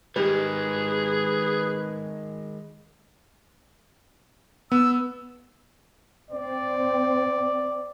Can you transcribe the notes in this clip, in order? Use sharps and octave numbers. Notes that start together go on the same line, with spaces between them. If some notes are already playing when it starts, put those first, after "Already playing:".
D#3 G3 G#3 G#4 B4
B3 E6
C4 D5